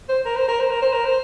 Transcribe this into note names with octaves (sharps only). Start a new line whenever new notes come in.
C5
A#4
C5
A#4
C5
A#4
C5
A#4
C5